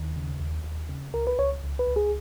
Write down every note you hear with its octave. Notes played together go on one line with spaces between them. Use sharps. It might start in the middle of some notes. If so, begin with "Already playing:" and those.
Already playing: D#2 D#3
C#3
D#2
D#2
C#3
C#2 A#4
B4
C#2 C#5
C#2
B4
C#2
G#4